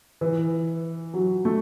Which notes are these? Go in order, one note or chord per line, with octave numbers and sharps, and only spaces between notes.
E3
F#3
A3